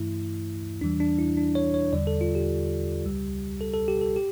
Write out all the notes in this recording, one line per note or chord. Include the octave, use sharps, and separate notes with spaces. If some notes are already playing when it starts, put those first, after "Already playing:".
Already playing: G2 E3 A3 E4
E2 E3 G3 D4
D4
E4
D4
C#5
C#5
E2 D3 G3 D5
A4
F4
G4
C#2 C#3 G3
A4
A4
G4
A4
G4